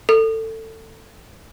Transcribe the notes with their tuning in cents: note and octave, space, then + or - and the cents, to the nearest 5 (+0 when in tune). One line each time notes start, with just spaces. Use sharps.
A4 +20